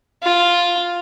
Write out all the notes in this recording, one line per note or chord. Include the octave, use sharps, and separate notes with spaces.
F4